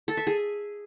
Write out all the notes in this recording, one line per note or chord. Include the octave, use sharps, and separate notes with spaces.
A4
E5
G#4